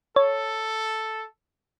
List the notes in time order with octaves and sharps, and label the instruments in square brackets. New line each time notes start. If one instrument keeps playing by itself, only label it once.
[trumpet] A4 [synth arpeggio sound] C#5